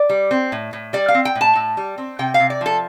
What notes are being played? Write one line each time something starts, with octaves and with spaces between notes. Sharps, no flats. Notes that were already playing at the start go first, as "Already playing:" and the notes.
Already playing: D5
G3
C4
A2
A2
G3 D5
F5
C4
G5
A2
A5
A2
G3
C4
C3 G5
F5
C3
D5
F3 A4